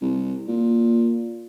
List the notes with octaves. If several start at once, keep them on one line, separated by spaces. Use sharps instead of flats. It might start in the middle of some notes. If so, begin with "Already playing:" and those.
C2
A#2